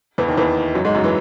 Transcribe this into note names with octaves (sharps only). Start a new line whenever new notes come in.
E2 E3
D#2 D#3
E2 E3
F#2 F#3
G#2 G#3
F#2 F#3
E3